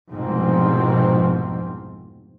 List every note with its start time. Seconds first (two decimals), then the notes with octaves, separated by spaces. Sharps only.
0.11 F1 C2 G#2 B2 F3 C4